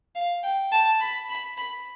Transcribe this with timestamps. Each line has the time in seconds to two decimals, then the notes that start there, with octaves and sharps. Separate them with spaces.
0.15 F5
0.43 G5
0.72 A5
1.00 B5
1.29 B5
1.58 B5